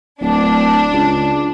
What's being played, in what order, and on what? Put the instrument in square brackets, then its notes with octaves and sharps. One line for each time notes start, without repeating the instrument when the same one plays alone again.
[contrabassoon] D1 [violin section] D4
[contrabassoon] C#2